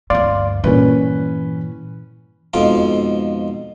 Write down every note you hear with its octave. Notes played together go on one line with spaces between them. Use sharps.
D2 G2 D5 F5 C6
G2 A#2 E3 C#4 B4
F2 G#2 B2 F3 F4 D6